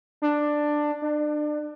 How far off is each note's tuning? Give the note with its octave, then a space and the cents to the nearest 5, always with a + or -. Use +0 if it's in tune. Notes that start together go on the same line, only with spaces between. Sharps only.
D4 +10
D4 +30